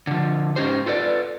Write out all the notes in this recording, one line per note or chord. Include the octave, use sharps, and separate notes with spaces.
D3 F3
G#2 C#4 D#4 G4 C5
F4 A4 B4 D5